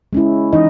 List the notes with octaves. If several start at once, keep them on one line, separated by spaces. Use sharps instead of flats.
G#3 C#4 E4
E3 D#4 D#5